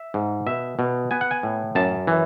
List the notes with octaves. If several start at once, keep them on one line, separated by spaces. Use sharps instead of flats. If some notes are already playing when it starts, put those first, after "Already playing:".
Already playing: E5
G#2
B2 E5
B2
B3 G#5
F#5
G#5
A2
F#2 A5
E3